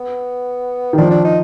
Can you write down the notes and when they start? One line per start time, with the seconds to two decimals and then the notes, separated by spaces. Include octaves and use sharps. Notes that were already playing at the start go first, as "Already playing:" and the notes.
Already playing: B3
0.93 D#3
0.98 F3 D4
1.11 D4
1.24 D#4